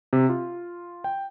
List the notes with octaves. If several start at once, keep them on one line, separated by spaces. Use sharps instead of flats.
C3
F4
G5